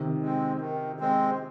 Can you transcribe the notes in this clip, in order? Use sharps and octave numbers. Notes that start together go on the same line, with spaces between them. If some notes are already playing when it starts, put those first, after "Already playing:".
Already playing: C3 D#3
G#3 C4
D#3
G#3 C4